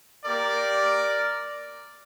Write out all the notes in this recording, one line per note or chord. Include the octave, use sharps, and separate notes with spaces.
A#3 G4 A#4 D5